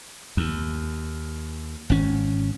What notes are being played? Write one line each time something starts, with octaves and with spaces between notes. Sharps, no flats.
D#2
G#1 C#4